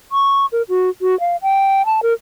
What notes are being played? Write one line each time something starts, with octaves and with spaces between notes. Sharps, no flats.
C#6
A#4
F#4
F#4
F5
G5
A5
A#4